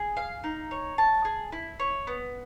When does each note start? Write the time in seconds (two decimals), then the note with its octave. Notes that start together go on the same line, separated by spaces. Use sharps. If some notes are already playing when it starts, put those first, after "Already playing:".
Already playing: G#4
0.17 F5
0.44 D#4
0.71 C#5
0.98 A5
1.25 G#4
1.52 E4
1.80 C#5
2.07 B3